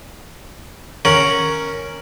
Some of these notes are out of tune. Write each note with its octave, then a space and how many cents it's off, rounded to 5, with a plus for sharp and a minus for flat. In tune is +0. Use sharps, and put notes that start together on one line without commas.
C#4 +0 A#4 +5 F#5 +0